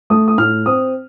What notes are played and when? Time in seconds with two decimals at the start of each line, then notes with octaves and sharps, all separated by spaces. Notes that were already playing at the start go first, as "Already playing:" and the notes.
0.10 A3 D#6
0.28 D#6
0.38 A2 F6
0.66 C4 D#6